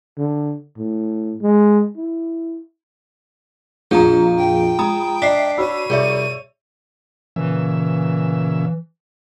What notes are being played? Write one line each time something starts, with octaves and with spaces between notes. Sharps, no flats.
D3
A2
G#3
E4
A#1 F2 F3 G#4 F5 A#5
G5
G#3 A#5 B5 D#6
D4 D#5 E5 B6 C7
F#4 C#5 B5 E6 D#7
C2 G#4 D5 E5
A#2 C#3 E3 E5